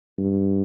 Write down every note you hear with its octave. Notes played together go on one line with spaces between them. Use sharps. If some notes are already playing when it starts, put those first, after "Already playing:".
G2